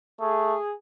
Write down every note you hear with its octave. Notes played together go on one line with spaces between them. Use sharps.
A3 G#4